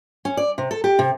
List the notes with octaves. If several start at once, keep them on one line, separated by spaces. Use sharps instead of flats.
C#4
D5
C3
A4
G4
C3